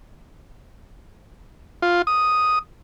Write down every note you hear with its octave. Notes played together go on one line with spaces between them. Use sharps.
F4
D#6